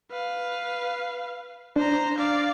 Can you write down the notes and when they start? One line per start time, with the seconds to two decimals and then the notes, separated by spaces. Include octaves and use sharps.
0.11 B4 F5
1.76 D4 C5 A#5
2.17 D5 F5